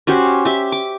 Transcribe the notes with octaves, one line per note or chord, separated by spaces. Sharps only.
C#4 F#4 G4 C5
G4 E5
D6